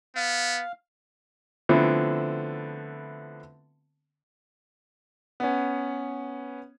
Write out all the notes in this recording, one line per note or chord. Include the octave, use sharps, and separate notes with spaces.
B3 F5
D3 F3 A3 B3 C4 E4
B3 C#4